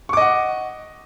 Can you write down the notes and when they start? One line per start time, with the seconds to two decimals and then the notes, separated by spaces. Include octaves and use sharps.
0.09 C#6
0.13 D6
0.17 D#5
0.21 F#5